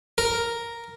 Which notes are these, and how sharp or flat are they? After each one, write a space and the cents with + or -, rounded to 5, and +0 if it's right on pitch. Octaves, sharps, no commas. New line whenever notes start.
A#4 +0